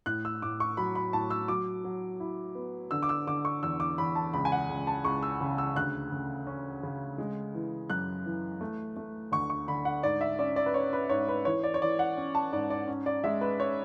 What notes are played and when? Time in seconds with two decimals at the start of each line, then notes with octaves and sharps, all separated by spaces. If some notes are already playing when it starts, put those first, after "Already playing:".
0.06 A2 F#6
0.25 E6
0.42 A2 D6
0.60 C#6
0.77 F#3 B5
0.95 B5
1.13 A2 A5
1.30 E6
1.48 F#3 D6
1.84 F#3
2.20 E4
2.55 B3
2.91 D3 E6
3.03 D6
3.09 E6
3.27 D3 D6
3.45 C#6
3.63 E2 E6
3.80 D6
3.98 E2 B5
4.15 A5
4.33 C#2 B5
4.45 G#5
4.52 F#5
4.69 C#2
4.87 A5
5.05 C#2 C#6
5.23 E6
5.41 C#3
5.58 E6
5.76 D2 F#6
6.12 C#3
6.47 C#4
6.83 C#3
7.18 G#3
7.55 E3
7.90 F#2 F#6
8.25 E3
8.61 A3
8.96 A3
9.32 D2 C#6
9.50 C#6
9.68 D3 B5
9.85 F#5
10.03 G#2 D5
10.21 E5
10.39 C#4 D5
10.56 D5
10.66 B4
10.74 C#4 C#5
10.93 B4
11.10 G#2 C#5
11.29 B4
11.45 E3 C#5
11.64 D5
11.74 C#5
11.82 E3 D5
11.99 F#5
12.17 C#4
12.35 A5
12.52 G#2 D5
12.70 D5
12.88 C#4
13.06 D5
13.24 G#3 E5
13.41 B4
13.59 C#4 C#5